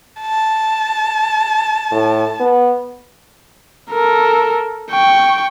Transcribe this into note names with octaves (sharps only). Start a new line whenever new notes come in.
A5
A2
B3
A4 A#4
G5 C#6